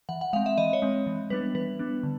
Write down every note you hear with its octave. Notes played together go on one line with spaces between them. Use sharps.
E3 F#5
F#5
G#3 C4 F5
E5
E3 D#5
C#5
G#3 C4
E3
G3 B3 D4 B4
E3 B4
G3 B3 D4
D3